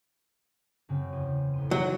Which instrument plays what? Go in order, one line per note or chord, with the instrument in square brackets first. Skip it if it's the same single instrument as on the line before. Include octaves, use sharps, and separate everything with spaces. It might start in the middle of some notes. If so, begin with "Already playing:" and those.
[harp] F#2 C#3 C4
E2 C6 D#7
A1 C6 D#7
[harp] D#2 [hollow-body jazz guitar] F#3